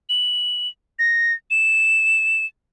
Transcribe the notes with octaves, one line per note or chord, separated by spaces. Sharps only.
F#7
A#6
E7